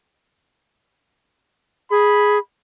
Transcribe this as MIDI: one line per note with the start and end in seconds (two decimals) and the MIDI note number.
1.91 2.38 68
1.91 2.40 83